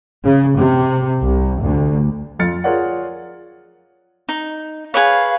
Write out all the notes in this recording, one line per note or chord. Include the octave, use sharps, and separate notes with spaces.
C#3
C3
C2
D2
F2 F4 F6 A6 C#7
F4 G#4 A#4 C#5 D5 F#5
D#4
G#4 B4 C#5 F5